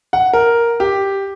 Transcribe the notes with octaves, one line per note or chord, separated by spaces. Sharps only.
F#5
A#4
G4